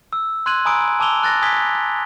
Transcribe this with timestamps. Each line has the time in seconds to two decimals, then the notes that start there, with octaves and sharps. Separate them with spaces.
0.13 E6
0.46 C6 F#6 G#6 D#7 F#7
0.65 G#5 A#5 B5 D#6 E6 D7
1.00 A5 D6 E6 F7 G7
1.22 A5 F#6 A6 A#6
1.42 G#5 D#6 G#6 B6 G7